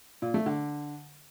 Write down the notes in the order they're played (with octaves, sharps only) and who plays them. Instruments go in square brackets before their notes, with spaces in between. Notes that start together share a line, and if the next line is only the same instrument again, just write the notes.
[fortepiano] A#2
A3
D3